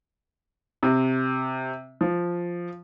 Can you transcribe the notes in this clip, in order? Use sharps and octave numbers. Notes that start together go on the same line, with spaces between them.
C3
F3